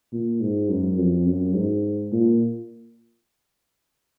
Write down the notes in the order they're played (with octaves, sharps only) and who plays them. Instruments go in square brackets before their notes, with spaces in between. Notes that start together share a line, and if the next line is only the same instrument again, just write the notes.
[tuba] A#2
G#2
F#2
F2
F#2
G#2
A#2